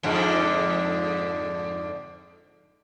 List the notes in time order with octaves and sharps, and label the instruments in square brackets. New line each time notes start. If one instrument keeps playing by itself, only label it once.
[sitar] F2 G#2 D3